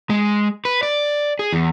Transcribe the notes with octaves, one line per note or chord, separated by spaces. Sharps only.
G#3
B4
D5
G#4
E2